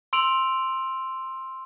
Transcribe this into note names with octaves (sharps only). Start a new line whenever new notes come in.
C6 E6 D7 F7 F#7